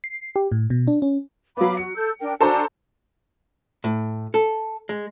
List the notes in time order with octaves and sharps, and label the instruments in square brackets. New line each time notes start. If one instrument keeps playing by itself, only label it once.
[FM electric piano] C7
G4
A2
B2
D4
C#4
[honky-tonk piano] F#3 B3 [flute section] F5 B5 D6
[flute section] F#4 [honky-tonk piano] C#7
[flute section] A4 E6 G6
D4 A#4 G5
[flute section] D4 F#4 G#5 [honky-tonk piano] A4 C5 A#5
[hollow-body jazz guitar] A2
A4
G#3